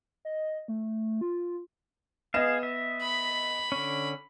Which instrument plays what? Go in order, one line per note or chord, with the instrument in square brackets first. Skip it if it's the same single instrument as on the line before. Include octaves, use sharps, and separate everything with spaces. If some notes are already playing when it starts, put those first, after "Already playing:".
[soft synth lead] D#5
A3
F4
[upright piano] B3 D#5 E7 [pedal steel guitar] G#4 F5
[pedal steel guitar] E5
[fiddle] B5
[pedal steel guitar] D3 C#4